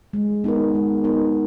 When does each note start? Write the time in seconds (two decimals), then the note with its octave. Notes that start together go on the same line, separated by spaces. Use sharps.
0.13 G#3
0.44 B3 D#4 A#4
0.75 G#3
1.04 B3 D#4 A#4